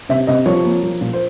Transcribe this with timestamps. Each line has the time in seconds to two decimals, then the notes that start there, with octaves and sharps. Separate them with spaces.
0.09 C3 E5
0.27 C3 D#5
0.46 F3 C#5
0.64 A#3
0.83 F3
1.01 A#2
1.13 C5